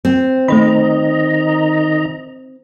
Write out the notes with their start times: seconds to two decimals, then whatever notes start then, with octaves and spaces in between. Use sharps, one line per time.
0.05 C4
0.48 D#3 A3 C5 D#5 A#5 B5